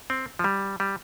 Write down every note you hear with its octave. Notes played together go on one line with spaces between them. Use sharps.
C4
F3
G3
G3